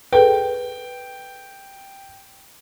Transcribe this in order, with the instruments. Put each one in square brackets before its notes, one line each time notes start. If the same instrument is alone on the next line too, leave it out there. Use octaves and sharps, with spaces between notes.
[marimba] G#4 A4 B4 [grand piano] G5